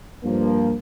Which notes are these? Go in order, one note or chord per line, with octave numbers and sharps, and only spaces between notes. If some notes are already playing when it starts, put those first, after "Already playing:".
G2 F3 A#3